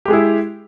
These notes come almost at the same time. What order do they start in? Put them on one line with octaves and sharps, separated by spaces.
G4 G#3 G#4 E4